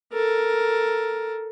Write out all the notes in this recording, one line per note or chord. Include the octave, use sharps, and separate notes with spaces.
A4 A#4